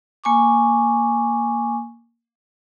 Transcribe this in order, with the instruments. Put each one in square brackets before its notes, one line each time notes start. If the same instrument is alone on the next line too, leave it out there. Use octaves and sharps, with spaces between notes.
[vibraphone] A#3 G#5 C#6 D6